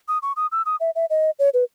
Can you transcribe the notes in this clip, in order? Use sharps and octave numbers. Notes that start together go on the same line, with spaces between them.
D#6
C#6
D#6
E6
D#6
E5
E5
D#5
C#5
B4